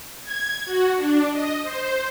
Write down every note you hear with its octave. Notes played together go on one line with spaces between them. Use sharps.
G#6
F#4
D4
D#5
C5